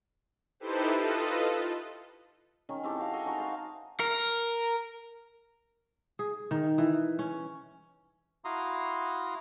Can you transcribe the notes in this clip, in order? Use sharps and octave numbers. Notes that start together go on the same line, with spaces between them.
D#4 E4 G4 A4 B4 C5
F4 A4 B4 D#5
D#3 C#4
C4 E4 G4 A4
F#4 F5
A4 D#5 G#5
D#4 F#4 A#4 C5
F5 A5
A#4
G#4
D#3
E3
C#4
E4 F#4 F5 A#5 C6 D#6